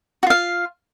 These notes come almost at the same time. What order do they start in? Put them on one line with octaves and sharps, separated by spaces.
F#4 F4 F5